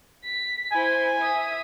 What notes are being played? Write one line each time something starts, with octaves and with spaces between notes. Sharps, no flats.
B6
E4 C5 G#5
E5 D#6